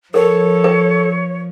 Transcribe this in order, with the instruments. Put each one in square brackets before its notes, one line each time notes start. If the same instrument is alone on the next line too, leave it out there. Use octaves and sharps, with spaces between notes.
[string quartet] F3 [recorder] A4 [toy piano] A#4 [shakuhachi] C#5
[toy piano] B4